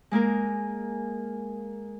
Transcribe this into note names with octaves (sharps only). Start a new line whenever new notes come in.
G#3 A#3 G#4 A#4